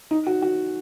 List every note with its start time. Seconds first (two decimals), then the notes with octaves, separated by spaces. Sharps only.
0.11 D#4
0.27 F#4
0.42 F#4